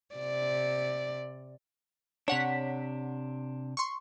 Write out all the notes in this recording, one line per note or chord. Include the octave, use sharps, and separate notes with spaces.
C3 D5
C3 D4 C#5 F#5 B6
C6 C#6